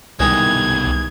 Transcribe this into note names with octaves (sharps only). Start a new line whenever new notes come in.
C2 B2 D#3 E3 G3 G#3 G#6